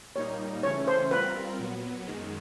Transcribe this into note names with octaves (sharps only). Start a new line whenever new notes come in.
A#2 G3 A#3 D#4 C#5
C#3 E3 A3 C#4 C#5
C5
G3 C4 F4 A#4 B4
A#2 F#3 B3
F#2 D#3 G#3